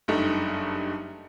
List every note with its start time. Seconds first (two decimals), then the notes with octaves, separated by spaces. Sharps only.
0.08 F#1 G2 A3 D#4